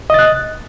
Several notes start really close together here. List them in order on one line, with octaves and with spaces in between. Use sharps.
D#5 A6 F#6